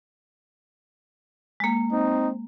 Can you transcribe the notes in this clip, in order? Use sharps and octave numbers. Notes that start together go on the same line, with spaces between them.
G#3 A#3
C4 D#4